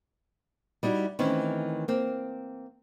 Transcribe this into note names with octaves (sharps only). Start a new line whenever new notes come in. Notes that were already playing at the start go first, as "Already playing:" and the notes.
G3 D#4 E4 F#4
D#3 E3 A3 C4 C#4
A#3 C4